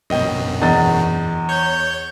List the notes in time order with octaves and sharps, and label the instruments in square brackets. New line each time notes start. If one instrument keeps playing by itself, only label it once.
[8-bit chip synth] F#2 B2 [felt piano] D#5 G5
[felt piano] E2 D#5 A6
[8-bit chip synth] C#5 [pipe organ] G6